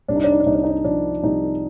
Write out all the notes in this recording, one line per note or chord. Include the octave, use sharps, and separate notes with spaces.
C2 D4
D#4
D4
D#4
D4
C2 D#4
D4
D#4
D4
F3 D4
C2 D#4